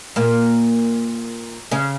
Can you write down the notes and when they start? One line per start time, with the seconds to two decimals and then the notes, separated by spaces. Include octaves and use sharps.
0.16 A#2 A#3
1.71 C#3 C#4